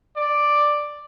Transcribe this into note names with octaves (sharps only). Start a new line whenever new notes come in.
D5